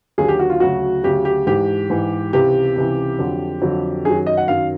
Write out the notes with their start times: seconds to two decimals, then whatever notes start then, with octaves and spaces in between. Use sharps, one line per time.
0.18 D#2 D3 F#3 G#4
0.29 G4
0.39 F#4
0.50 F4
0.60 D2 C#3 F#3 F#4
1.04 D2 C#3 F#3 G4
1.25 G4
1.47 G#2 E3 G4
1.90 G#2 E3
2.33 C#2 C3 E3 G4
2.76 C#2 C3 E3
3.19 F2 D3 F#3
3.62 F2 D3 F#3
4.05 F#2 D#3 F#3 G#4
4.27 D#5
4.37 F#5
4.48 F#2 D#3 F#3 F5